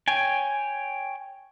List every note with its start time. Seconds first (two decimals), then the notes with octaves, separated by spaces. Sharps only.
0.08 C#5 G5 G#5